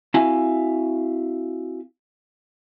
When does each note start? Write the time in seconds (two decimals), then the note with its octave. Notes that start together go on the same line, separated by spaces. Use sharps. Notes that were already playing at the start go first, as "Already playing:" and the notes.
0.14 C4 E4 F#4 E5 F5 G#5